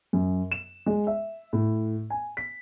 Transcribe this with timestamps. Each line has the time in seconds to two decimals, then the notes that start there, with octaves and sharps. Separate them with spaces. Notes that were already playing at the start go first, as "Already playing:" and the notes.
0.13 F#2
0.52 E7
0.86 G#3
1.07 E5
1.53 A2
2.10 G#5
2.37 B6